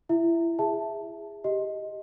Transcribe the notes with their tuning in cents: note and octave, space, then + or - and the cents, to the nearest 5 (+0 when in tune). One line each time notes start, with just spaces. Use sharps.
E4 +25 E5 +0
G#4 -20 E5 +0 A5 +0
G4 +0 D#5 +5